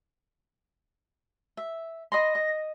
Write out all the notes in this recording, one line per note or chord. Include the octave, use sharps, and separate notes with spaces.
E5
D#5 B5 C6 A#6
D#5